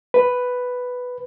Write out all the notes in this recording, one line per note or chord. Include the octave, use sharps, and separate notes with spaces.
B4